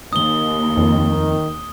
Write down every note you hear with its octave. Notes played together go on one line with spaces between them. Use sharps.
D#2 D#6 G7
F2 D#3